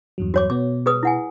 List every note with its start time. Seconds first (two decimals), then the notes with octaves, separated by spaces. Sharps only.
0.18 E2 G2 F#3
0.34 F#4 C#5 D6
0.50 B2 B3 D6
0.86 G#4 B4 D#6
1.03 E4 F#5 G#5